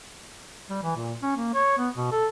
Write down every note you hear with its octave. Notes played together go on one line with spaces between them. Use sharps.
G3
E3
A#2
C#4
A#3
C#5
B3
B2
A4